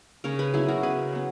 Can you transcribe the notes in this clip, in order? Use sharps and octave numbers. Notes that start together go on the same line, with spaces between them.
C#3 A#4 C#5
G#4 B4
F#3 B3 E4 G#4
F#4 A#4
C#3 G#4 B4
F#3 B3